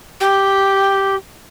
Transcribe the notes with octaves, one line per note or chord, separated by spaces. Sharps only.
G4